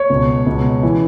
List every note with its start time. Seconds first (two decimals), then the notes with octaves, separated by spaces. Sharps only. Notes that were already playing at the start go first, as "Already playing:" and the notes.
Already playing: C#5
0.10 C#2 B2
0.46 C#2 B2
0.83 E3